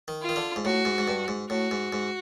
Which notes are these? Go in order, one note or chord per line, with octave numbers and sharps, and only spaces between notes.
D#3
F4
D#3
D3
G#2
A2 F#4
G#2
G#2
G2
G#2
A2 F#4
G#2
G#2